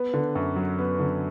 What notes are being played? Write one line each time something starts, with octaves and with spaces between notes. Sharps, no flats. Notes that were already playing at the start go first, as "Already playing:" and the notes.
Already playing: B3
D3
F#2
F#3
B3
D3